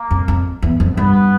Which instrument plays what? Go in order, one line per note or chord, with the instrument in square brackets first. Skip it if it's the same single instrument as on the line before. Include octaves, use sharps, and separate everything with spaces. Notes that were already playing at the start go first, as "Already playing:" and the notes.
Already playing: [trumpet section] A#3
[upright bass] F2
F2
E2
F2
[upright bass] G2 [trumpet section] B3